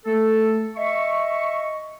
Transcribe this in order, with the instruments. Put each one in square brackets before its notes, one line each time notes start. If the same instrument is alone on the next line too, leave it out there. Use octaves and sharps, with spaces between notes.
[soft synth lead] A3 [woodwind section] A4
[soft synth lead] D#5 [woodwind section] E5 C#6